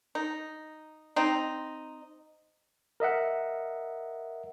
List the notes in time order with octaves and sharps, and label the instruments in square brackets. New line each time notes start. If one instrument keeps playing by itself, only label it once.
[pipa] D#4
C4 D#4
[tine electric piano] A#4 D#5 E5 F#5